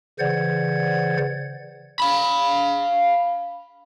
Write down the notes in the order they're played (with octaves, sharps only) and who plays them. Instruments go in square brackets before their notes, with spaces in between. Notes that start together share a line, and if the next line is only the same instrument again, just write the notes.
[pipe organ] C#3 E3 C5 D5 F#5 G#6
[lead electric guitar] F5 B5